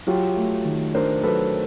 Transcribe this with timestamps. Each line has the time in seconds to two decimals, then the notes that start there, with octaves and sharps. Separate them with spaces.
0.07 F#3 F4 G4
0.36 A3
0.65 D#3
0.95 D4 A#4 C5
1.23 F#3 A4 B4